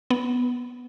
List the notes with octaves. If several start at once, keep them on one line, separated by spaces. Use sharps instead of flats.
B3